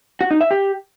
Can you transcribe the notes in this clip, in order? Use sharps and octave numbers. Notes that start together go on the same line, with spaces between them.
F#4
D#4
E5
G4